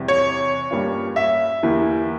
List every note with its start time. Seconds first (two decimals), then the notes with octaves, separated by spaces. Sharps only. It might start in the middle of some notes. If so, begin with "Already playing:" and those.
Already playing: E2 C3 G3
0.08 C#5
0.71 G2 G3 A#3 C#4 F4
1.16 E5
1.63 E2 E3 A#3 E4 G4